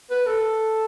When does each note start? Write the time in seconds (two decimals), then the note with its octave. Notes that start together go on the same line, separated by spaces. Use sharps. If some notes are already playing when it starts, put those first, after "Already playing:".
0.10 B4
0.26 A4